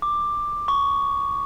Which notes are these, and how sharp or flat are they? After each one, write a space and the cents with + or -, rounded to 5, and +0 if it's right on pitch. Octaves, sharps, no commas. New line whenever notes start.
D6 +10
C#6 +10